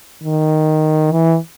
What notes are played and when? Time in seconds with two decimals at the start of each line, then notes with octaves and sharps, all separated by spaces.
0.23 D#3
1.12 E3